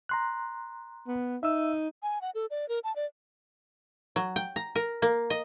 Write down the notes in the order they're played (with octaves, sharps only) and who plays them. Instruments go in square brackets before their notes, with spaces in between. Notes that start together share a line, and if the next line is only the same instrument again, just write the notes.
[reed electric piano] A#5 C6 F#6
[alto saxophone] B3
[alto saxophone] D#4 [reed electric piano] E5 E6
[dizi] G#5
F#5
A4
D5
A#4
A5
D5
[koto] F#3
G5
A#5
A#4
A#3
D#5